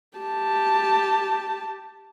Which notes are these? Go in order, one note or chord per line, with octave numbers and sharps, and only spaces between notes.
G4 A5